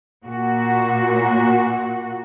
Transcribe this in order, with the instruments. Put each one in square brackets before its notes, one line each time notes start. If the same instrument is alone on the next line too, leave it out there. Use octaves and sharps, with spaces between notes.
[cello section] A#2 F#4